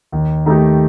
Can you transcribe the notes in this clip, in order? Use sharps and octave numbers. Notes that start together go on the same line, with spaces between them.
D#2
D#3 A3 D#4 G4